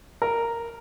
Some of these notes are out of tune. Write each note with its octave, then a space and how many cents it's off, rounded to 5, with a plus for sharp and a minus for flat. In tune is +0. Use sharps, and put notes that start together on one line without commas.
A#4 -5